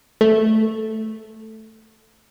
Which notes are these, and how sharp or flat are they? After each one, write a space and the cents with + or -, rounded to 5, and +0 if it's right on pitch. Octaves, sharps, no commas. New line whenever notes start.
A3 +0